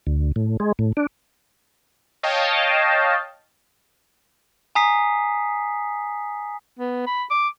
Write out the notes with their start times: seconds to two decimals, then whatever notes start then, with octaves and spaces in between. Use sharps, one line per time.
0.07 D2
0.36 A2
0.60 G#3
0.79 A2
0.97 D4
2.23 C#5 D#5 F5 G5 A5
4.75 G#5 A#5 D#6 B6 C7
6.79 B3
7.07 B5
7.31 D6